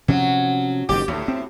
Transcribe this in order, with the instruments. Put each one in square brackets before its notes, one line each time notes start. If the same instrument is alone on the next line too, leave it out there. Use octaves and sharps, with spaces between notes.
[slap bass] C3 F3 C#4 [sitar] F#3
[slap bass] F#1 G#2 D#3 [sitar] G4
[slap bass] D2 [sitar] A2
[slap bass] C4